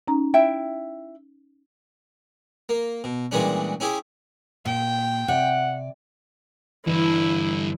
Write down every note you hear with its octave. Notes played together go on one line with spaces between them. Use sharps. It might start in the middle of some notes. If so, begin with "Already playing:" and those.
C#4 D#4 A#5
E4 E5 G5
A#3
B2
A#2 E3 G3 G#3 C#4 D4
C#4 E4 G4 G#4
A#2 G5
C3 D5 F#5
G2 D3 E3 E4